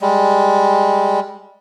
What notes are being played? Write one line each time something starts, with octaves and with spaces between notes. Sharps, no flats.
G3 G#3